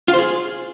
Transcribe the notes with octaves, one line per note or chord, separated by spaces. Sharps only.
F4
C5
G#4